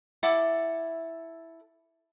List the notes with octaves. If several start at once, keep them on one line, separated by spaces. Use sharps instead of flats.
E4 A4 F#5 D6